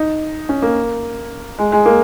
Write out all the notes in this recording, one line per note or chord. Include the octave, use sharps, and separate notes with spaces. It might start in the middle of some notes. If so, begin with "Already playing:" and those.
Already playing: D#4
C#4
A#3
G#3
G#3
A#3